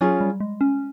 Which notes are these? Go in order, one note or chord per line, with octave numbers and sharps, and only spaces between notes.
F#3 C#4 F4 G#4 C#5
G3
G#3
C#4